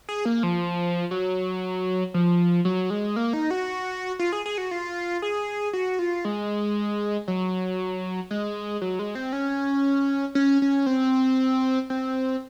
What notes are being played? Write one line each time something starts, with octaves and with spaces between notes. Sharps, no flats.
G#4
A#3
F3
F#3
F3
F#3
G#3
A#3
D#4
F#4
F4
G#4
G#4
F#4
F4
G#4
F#4
F4
G#3
F#3
G#3
F#3
G#3
C4
C#4
C#4
C#4
C4
C4